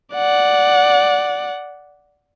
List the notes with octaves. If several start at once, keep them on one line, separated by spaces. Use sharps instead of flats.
D5 F#5